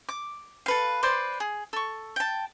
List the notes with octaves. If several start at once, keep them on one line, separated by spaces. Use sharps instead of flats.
D6
A4 B4 F5
B4 C5 D5 C6
G#4
A4 C#6
G5 A5